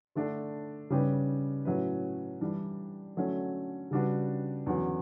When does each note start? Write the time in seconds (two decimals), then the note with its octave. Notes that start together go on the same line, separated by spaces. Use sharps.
0.15 D3 A3 D4 A4
0.90 C#3 G3 C#4 G4 B4
1.65 A2 F#3 C#4 E4 B4
2.41 E3 G3 D4
3.17 D3 F#3 A3 C#4
3.91 C#3 G3 D4 F#4 B4
4.66 E2 D3 F#3 C#4 F#4